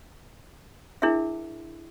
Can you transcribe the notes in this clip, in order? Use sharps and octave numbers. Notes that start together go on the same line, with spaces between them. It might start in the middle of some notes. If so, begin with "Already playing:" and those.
D4 E4 G#4 A#4 E5